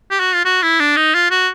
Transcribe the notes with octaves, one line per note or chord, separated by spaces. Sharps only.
G4
F#4
F4
F#4
E4
D4
D#4
F4
F#4